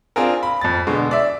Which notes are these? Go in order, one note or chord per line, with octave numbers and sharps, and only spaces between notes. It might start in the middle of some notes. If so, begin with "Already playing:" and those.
C4 D4 F4 G#4 A#4
B5
F2 A6
B2 D3 G#3
D5 E5